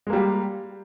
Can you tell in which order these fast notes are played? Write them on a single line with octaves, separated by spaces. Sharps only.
G#3 A#3 G3 G4